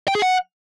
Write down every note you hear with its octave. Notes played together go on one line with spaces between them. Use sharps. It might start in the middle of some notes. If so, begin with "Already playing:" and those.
G5
G#4
F#5